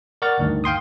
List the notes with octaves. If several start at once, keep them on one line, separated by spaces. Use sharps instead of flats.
A#4 D5 F#5 C#6 F6 A6
D2 G2 D#3
F5 G5 C6 D#6